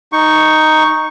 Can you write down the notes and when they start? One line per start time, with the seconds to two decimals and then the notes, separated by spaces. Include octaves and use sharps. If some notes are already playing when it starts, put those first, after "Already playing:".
0.12 D#4 C#6